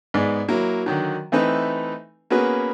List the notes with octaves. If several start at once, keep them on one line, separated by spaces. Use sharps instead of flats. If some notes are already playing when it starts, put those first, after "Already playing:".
G#2 G#3 B3 D5
F#3 A#3 E4
D3 D#3 F#3
E3 A3 C4 D#4 B4
A#3 B3 C#4 F#4 G#4 B4